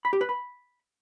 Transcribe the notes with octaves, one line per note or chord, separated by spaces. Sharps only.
B5
G4
B4
B5